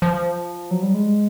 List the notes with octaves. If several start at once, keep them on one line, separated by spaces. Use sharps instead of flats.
F3
F#3
G3
G#3